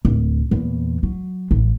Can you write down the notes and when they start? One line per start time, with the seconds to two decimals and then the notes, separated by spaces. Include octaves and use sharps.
0.05 D1
0.51 E2 A#2
1.03 F#3
1.51 A1